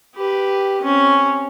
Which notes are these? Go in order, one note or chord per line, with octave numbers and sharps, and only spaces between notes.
G4 B4
C4 C#4